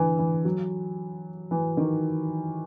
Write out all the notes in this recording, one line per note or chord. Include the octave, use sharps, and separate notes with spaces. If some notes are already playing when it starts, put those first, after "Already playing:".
Already playing: D3 E3
E3
F#3
E3
D#3